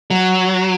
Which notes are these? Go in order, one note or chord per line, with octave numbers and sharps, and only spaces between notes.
F#3